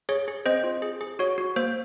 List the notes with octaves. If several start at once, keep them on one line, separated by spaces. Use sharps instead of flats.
G#4 C#5
G#4
C4 C5 D#5
F4
G#4
G#4
F#4 C#5
F#4
A#3 C5